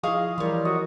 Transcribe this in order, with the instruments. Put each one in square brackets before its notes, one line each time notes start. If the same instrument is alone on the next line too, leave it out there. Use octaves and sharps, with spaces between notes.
[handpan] F3 E4 [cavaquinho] G#4 F5 C#6 [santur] D#5
[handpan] E3 E4 A#4 [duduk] G3 [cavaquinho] C#5 C6
[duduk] F#4 [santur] D#5